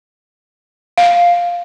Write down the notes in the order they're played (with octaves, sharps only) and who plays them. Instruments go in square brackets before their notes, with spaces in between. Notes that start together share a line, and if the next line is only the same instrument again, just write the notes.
[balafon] F5